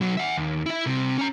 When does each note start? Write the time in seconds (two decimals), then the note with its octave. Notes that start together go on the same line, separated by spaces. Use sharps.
0.01 B1 F#3
0.17 E5 F#5
0.37 D#2
0.66 E4 E5
0.86 C2 C3
1.18 C#4 A#5